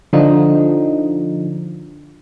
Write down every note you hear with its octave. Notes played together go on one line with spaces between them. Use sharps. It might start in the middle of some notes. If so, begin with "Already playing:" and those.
D3 F3 D#4